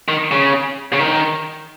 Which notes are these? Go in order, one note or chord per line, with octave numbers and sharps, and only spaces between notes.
D#3
C#3
C#3
D#3